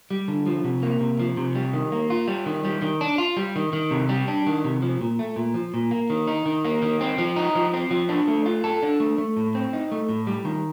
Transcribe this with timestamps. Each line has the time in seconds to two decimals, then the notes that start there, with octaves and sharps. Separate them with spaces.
0.11 G3
0.28 D3
0.46 F3
0.64 C3
0.83 A#3
1.00 C3
1.20 F3
1.37 C3
1.55 G3
1.74 D#3
1.92 A#3
2.10 F4
2.28 G3
2.46 D#3
2.65 G3
2.82 D#3
3.01 D4
3.18 F4
3.37 G3
3.56 D#3
3.73 D#3
3.91 C3
4.09 G3
4.28 D4
4.47 D#3
4.64 C3
4.82 F3
5.01 A#2
5.19 A3
5.36 A#2
5.54 F3
5.74 A#2
5.91 A#3
6.10 D#3
6.27 D#4
6.46 D#3
6.65 A#3
6.82 D#3
7.01 C4
7.18 F3
7.36 D#4
7.55 F3
7.74 C4
7.91 F3
8.09 D4
8.28 A3
8.46 F4
8.64 A4
8.83 D4
9.00 A3
9.18 A3
9.37 A2
9.55 C4
9.73 D#4
9.92 A3
10.09 A2
10.27 G3
10.45 D#3